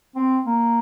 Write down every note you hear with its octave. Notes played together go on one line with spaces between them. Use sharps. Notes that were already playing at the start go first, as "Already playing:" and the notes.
C4
A#3